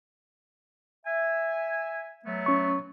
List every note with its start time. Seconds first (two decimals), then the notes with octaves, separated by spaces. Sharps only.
1.06 E5 G#5
2.25 F#3 A3 B3
2.46 C#4 C#6